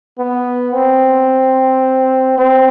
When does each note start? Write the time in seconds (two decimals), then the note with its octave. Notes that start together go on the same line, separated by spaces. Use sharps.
0.19 B3
0.74 C4
2.38 C4